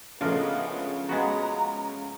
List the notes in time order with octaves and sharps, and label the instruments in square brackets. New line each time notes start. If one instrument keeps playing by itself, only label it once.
[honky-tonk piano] C#3 F3 A3 [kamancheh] G#3 B3 [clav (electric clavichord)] D4 F4 A#4
[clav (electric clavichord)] G#3 B3 F#4 [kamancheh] A#5